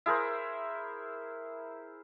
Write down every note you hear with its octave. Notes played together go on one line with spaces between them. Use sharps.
E4 G#4 A#4 C5